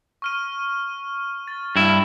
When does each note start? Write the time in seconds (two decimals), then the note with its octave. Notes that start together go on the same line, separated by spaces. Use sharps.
0.22 C#6 F6 D#7
1.48 A6
1.76 G2 E4